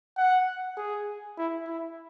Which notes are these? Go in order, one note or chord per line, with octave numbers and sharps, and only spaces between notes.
F#5
G#4
E4
E4